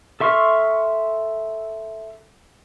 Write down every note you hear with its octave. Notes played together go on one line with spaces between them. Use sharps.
A4 E5 C6 C#6 F6